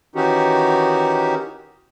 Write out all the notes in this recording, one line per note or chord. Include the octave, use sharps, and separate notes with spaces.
D#3 E3 C#4 D#4 F#4 G4